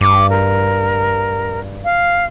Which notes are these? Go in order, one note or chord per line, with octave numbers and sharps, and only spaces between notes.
G2 D6
A#4
F5